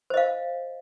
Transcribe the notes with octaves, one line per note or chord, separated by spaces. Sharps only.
C5 D#5 F5